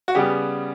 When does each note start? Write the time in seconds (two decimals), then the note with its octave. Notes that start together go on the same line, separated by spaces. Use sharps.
0.08 F#4
0.15 C#3 G3 B3 G4